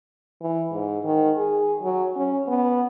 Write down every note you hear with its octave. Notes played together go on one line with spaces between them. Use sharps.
E3
G#2
D#3
G#4
F#3
C#4
B3